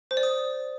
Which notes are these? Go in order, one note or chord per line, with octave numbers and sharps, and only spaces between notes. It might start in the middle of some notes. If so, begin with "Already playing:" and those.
C5
D5
D#6